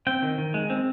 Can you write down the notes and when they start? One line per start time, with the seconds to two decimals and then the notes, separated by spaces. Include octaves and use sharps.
0.07 C4 G5
0.22 D#3
0.38 D#3
0.54 G#3
0.70 C4